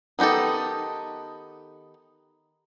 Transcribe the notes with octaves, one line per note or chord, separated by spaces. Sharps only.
D#3 B3 D#4 G4 A4